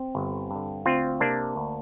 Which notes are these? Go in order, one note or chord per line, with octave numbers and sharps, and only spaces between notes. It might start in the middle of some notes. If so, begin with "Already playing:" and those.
Already playing: C4
G1
G2 D3
D2 C4 F4
C3 A#3 D4
D2